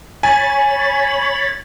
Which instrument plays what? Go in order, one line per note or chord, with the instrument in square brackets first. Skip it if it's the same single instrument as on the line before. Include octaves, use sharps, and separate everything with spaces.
[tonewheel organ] C#5 B5 [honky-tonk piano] G#5 [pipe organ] A6